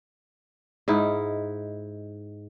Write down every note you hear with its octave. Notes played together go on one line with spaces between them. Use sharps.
G#2 D#4 E4